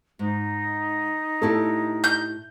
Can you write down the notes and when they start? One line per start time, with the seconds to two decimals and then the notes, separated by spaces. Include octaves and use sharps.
0.19 G#2 D#4
1.42 A2 E4 G4 A4
2.04 G6